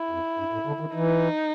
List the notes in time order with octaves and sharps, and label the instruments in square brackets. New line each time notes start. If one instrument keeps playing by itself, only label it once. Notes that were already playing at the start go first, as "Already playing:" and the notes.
Already playing: [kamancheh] E4
[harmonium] F2
G2
A2
D3
D#3
[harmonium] E3 [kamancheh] D#4